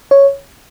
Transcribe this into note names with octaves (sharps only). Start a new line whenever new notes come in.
C#5